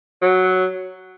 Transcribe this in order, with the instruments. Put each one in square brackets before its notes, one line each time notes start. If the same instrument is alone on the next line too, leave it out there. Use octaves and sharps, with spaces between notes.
[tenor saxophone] F#3